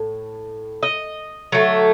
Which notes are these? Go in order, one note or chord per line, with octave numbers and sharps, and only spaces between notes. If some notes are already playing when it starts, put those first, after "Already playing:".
Already playing: A2
D#5
D3 F#3 A3